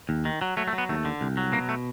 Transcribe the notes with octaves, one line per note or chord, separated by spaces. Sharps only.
D#2
D#3
F#3
F#3 A3
A3
F#3
B3
D#2 A3
D3
C2
F#3
B2 A#3
A3